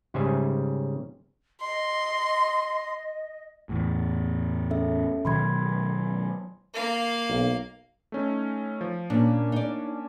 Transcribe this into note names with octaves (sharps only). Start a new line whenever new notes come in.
G#2 C#3 G3 C5 E5 G#5
D#5 C6
E2 A2
C#4 A4 E5
B2 D#3 F#3 B5 C6 G#6
A#3 F5
B1
A3 C#4 D#4
F3
A#2 A#3 C#4 D4
D#4 D5